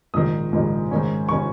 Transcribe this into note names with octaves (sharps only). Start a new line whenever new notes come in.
A#1 G#2 D#3 D#6
A#1 G#2 D#3
G#2 D#3 C#4
D#3 C#4 C#6